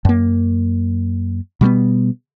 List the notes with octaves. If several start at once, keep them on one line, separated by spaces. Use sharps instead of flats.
F#2 A#3
B2 G3 A3 B3